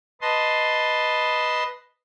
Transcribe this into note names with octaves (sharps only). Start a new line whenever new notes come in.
B4 D#5 A5 C6